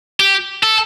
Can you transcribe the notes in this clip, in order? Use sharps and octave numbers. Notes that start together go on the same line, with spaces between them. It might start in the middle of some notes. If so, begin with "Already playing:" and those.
G4
A4